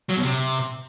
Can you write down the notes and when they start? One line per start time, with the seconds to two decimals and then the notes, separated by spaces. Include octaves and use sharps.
0.10 F#3
0.16 B2
0.23 C3